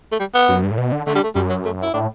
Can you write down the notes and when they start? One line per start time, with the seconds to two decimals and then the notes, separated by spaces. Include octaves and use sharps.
0.12 A3
0.20 G3
0.35 B3
0.49 F#2
0.63 G2
0.71 A2
0.78 B2
0.92 D3
1.07 D3 A3
1.15 G3
1.24 A3
1.35 F#2 G3
1.50 F#3
1.65 A3
1.83 E4
1.93 A2 D4